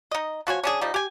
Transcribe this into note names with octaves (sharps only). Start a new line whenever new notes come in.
D#4 D#5
F3 F#4 C#5 G#5
C#4 D4 G#4
F3 G3 D#4
G4 G#5